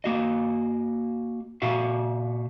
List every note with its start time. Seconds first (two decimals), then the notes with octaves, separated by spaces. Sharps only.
0.04 A#3 F#4 D#5
1.62 A#2 F#4 E5 F5